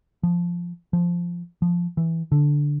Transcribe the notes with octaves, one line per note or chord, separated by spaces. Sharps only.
F3
F3
F3
E3
D3